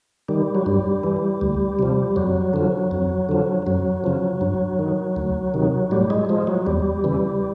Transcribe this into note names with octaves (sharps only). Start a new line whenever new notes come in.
D#3 G3
F#3
G2 G3
E3
D2
C3 F3
F2 F#3
D3 F3
F2
D3 F3
F#2 F#3
C#3 F3
G2
D#3
D2
C3 D#3
A2 G3
G#3
F3 G#3
F#3
E2 G3
C#3 E3